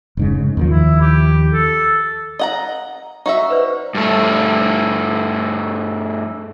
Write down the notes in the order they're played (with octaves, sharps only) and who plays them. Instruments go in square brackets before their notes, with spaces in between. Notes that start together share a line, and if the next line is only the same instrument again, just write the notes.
[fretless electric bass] F1 G#2 C#3
D#2 D#3 F3
[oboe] E4
G4
A4
[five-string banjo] D#5 F#5 A#5
[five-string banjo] D#4 F#4 E5 [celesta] C#6
[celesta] B4 C5 D5
[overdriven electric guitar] G2 A3